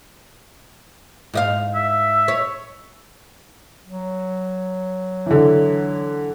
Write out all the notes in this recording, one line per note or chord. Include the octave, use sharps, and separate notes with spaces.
G#2 D#5 F5
E5
C#5
F#3
D3 E3